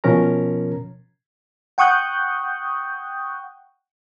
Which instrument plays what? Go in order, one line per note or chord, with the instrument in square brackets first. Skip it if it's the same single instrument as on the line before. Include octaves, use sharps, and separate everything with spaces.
[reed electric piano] B2 F3 C#4 A#4 A#5
[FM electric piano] F#5 G5 C#6 D#6 F#6 G6